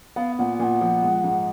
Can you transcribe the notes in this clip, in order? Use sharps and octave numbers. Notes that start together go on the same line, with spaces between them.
B3 F5
A#2 F#5
A#2 F#5 G#5
F3
G#3
G#2